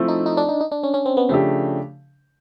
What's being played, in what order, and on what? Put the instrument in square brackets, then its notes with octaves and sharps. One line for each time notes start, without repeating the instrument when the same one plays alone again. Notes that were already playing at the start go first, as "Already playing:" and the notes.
Already playing: [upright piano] F3 A3 C4 E4 A4
[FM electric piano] D#4
D#4
D4
D#4
D#4
D4
C#4
C#4
C4
B3
[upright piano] C#3 F3 A3 D4 G4 [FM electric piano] C4